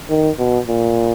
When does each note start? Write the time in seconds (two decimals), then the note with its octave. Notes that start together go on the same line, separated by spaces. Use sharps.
0.10 D#3
0.39 B2
0.68 A#2